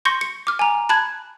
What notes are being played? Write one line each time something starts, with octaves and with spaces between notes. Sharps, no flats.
C6 C#6 G6 A#6 C#7
C#7
D6 F6
G#5 A#5
A5 B5 F#6 G#6